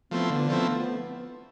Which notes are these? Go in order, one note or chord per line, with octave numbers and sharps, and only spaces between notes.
F3 A3 B3 C4 E4
D3 B3
F3 A3 C4 E4